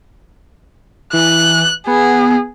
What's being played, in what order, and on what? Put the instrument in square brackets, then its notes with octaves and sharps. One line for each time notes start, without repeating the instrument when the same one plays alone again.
[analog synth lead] E3 [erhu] F#6
[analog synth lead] B3 [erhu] G#4